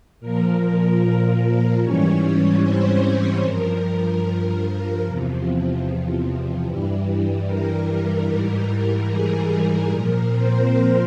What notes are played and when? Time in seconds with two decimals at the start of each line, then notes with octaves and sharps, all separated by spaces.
0.20 A#2 F3 A#4
1.81 G#2 E3 G3 C#4 C#5
2.62 C4 C5
3.43 G2 F3 A#4
5.04 E2 C3 F3
6.66 G2 E3 G3
7.47 A#4
8.27 G#2 E3 G3 A#4
9.08 G#4
9.89 A#2 F3 A#4
10.29 C4 C5